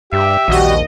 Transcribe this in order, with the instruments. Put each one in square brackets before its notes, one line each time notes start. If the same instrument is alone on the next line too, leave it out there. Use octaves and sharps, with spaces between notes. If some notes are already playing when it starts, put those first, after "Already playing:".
[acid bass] G2 [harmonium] G4 [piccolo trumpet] E5
[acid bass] A#1 [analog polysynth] D#2 D#5 [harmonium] G3 F#4